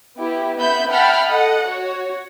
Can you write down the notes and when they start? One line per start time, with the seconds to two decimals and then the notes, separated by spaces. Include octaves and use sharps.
0.20 B3 E4 G4
0.59 B3 E5 B5 G6
0.91 E5 F#5 G5 A5 B5 F6
1.30 A4 D#5 F#5
1.69 F#4 C#5